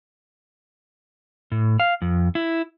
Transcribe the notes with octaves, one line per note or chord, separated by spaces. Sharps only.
A2
F5
F2
E4